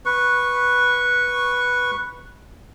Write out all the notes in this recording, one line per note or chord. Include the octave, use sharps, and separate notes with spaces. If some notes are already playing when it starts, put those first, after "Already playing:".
B4 C#6